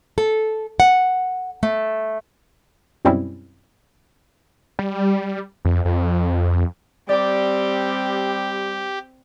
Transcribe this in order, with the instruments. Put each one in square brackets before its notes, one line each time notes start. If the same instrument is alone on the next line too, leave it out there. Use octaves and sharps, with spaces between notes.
[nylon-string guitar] A4
F#5
A3
[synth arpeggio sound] F#2 B2 G3 C4 C#4 E4
[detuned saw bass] G3
F2
F2
[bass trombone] G3 [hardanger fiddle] C4 [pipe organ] G4 [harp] D5 D6